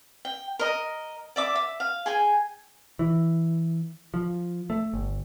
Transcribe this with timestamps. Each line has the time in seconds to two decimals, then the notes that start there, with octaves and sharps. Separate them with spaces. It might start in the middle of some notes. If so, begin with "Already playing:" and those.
0.25 G5
0.59 A#4 D#5
1.36 D5 E5 D6
1.55 E5
1.80 F5
2.06 G#4 G5 G#5
2.99 E3
4.14 F3
4.70 A3
4.93 G1